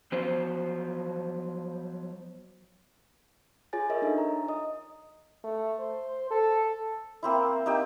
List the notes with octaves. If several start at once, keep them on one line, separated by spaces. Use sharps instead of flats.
F3 F#3 B3 C5
F4 G#4 C#5 G#5 A6
A#4 C#5 D#5 E5
D4 D#4 A4
A#5
D#5 D#6
A3
C5
A4
A#3 C4 E4
A#3 D#4 G4